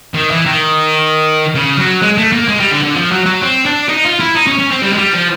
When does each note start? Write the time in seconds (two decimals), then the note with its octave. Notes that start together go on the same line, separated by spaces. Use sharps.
0.14 D#3
0.31 E3
0.46 D#3
1.55 C#3
1.78 F#3
2.02 G#3
2.18 A3
2.32 A#3
2.49 G#3
2.60 G3
2.72 D3
2.83 D3
2.96 F3
3.12 F#3
3.26 F#3
3.42 C4
3.66 D4
3.89 D#4
4.05 F4
4.20 E4
4.35 D#4
4.47 C#4
4.59 C#4
4.71 C4
4.82 G3
4.93 G#3
4.98 G3
5.13 F3